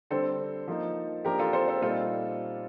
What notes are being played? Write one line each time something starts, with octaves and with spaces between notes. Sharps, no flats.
D3 G3 C4 A4 C5
F3 A#3 D#4
F3 A#3 D4 G4 A#4
F4 A4
A4 C5
A4 C5
A#2 G3 C4 D#4 F4 A4